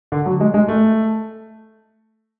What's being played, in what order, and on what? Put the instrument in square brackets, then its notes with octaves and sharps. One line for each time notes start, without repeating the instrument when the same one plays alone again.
[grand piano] D3
F#3
G#3
G#3
A3